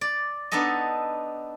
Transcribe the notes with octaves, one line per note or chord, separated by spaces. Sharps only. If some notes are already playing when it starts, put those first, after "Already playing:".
D5
B3 D4 D#4 A4 D#5